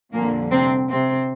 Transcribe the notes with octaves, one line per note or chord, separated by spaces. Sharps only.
F2 A#2 D3 G3 A#3
C3 C4
C3 C4